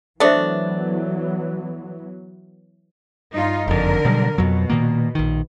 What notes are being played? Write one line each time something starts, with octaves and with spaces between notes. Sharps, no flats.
E3 F#3 A3 B3 D4 A4 C5 E5
G2 D#4 F4
F#1 F2 D3 A#4
B2 F#3 G3
F2 B2 F#3
A#2 D#3 A#3
A#1 D#3